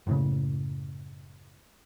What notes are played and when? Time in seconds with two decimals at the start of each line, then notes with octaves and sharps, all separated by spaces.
0.07 F#1 A2 C#3